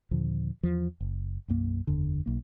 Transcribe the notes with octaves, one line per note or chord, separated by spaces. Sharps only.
D#2 A#2 D3 F3
E2 F3
F#1
B1 F#2 A#3
F#1 E2 D3
B1 A#3